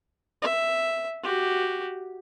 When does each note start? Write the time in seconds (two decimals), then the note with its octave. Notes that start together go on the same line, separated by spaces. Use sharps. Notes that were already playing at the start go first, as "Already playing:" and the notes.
0.42 E5
1.23 F#4 G4